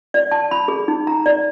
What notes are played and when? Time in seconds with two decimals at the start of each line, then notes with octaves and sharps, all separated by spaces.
0.14 D5
0.31 A5
0.51 B5
0.68 G#4
0.88 D#4
1.07 A#5
1.26 D5